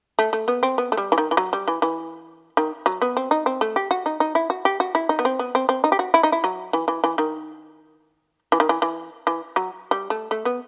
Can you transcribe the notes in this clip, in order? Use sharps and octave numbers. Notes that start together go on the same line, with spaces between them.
A3
A3
B3
C4
B3
A3
G3
E3
D#3
E3
F#3
G3
E3
E3
D#3
F#3
B3
C4
D#4
C4
A3
G4
F#4
D#4
D#4
E4
F#4
G4
F#4
E4
D#4
B3
C4
B3
C4
C4
D#4
G4
F#4
E4
D#4
E4
F#3
E3
E3
E3
D#3
E3
D#3
E3
E3
E3
F#3
G3
A3
A3
B3